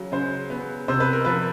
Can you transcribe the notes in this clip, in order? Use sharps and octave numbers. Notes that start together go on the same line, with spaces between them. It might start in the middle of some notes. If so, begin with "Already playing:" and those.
Already playing: C#3 F#3
C#3 C5
B3
C3 C5
B4
A#4
F3 B4